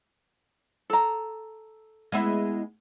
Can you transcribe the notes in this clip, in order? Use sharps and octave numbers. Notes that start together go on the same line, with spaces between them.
A4 A#5
G#3 B3 E4